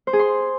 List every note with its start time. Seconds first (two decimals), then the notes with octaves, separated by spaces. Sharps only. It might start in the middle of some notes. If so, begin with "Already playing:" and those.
0.07 C5
0.13 G#4
0.19 C6